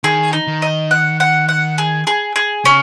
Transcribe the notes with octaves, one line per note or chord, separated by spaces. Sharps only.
D#3 G#4
D#4
D#3
D#5
F#5
F#5
F#5
G#4
G#4
G#4
C#3 C#4